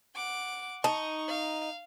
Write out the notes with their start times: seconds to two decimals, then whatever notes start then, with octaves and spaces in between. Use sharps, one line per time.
0.15 F#5 D6
0.84 D#4 A5 C#6
1.28 F5